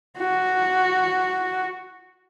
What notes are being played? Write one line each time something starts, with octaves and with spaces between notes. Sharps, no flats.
F#4